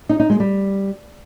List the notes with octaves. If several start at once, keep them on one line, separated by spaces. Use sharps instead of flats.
D#4
D#4
G#3
G3